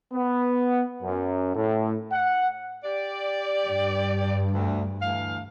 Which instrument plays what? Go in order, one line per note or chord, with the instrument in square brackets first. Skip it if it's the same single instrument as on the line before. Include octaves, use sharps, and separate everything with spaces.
[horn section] B3
F#2
A2
F#5
[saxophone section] G4 D5
[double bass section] G2
[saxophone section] D2
D2 E3 F5